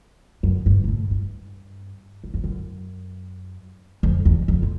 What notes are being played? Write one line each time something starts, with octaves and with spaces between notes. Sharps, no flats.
F#2
G2
G#2
A2
G2
F#2
F2
F#2
F2
E2
F2
C3